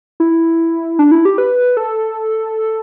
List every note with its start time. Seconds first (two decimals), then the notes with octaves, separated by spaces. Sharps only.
0.20 E4
0.99 D4
1.11 E4
1.25 G4
1.38 B4
1.77 A4